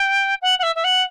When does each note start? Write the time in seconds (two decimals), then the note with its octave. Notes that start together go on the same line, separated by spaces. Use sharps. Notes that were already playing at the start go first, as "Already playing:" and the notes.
Already playing: G5
0.42 F#5
0.59 F#5
0.63 E5
0.75 E5
0.84 F#5